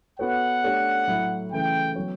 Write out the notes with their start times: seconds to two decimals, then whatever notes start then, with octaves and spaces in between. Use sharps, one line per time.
0.19 B3 F#4 A4 C#5 F#5
0.64 A3 D4 G4 C#5
1.07 A2 F#3 A3 E4
1.52 C#3 E3 A3 G5
1.96 F#3 B3 F#4 C#5